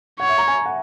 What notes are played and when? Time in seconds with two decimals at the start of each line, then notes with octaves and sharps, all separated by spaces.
0.20 C#5 F#5
0.29 E5
0.38 A#5
0.48 G#5
0.66 F#5